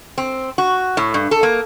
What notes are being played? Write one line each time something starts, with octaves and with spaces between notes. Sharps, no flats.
C4
F#4
A2
G2
A4
A#3